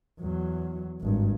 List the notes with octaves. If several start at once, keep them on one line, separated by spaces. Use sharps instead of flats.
E2 F#3
G#1 G2